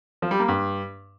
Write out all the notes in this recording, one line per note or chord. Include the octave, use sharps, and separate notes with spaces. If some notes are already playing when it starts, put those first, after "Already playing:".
F3
G3
A#3
G2